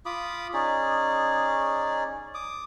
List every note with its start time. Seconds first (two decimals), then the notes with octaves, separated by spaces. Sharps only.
0.06 F4 B5 D6 D#6
0.54 C#4 D#4 G#4 D5
2.34 D6 D#6